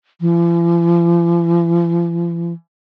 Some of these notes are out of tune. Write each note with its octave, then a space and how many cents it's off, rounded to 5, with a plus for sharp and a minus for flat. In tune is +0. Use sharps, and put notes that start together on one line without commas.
F3 -45